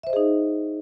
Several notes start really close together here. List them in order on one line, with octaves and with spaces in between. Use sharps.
E5 C5 D#5 G#4 D#4